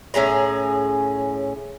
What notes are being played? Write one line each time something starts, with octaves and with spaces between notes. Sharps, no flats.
A2 C#4 G#4 A#5